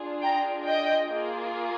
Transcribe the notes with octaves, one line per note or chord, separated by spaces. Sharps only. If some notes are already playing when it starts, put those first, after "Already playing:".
Already playing: D4 F4 G#4
G5 A#5
D#5 G5
A#3 F4 G#4